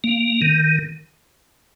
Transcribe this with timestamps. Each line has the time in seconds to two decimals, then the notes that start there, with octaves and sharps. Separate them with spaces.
0.04 A#3
0.42 D#3